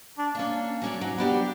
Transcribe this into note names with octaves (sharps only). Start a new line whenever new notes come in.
D4
A#3 C#4 D4
F#3 C#4 D5
G#2 F#3
F#3 B3 D4 G4